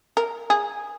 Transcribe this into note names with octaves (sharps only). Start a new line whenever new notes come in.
A#4
G#4